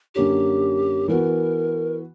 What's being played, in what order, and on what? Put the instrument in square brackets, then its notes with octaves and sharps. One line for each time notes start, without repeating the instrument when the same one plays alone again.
[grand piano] F#2 D3 A#3 C#4 [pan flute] G4
[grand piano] E3 B3 F#4 [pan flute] A#4